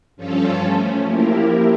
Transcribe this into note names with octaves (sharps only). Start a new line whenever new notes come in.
G2 F3 C#4 F4 A4
F3 A3 C#4
F3 A#3 E4 G4 A#4